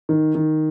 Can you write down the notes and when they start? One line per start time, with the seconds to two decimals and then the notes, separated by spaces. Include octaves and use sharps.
0.09 D#3
0.35 D#3